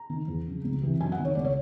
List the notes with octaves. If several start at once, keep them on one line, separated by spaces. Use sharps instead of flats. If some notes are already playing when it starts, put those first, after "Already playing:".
Already playing: A#5
D#3
E2
C#3 F3
C#2
C3 E3
F#2 G#5
F#5
D#3
C#5
C#2 D5
C#5